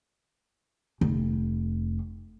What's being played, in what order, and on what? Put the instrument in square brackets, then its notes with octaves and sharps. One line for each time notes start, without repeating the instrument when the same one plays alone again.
[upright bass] F1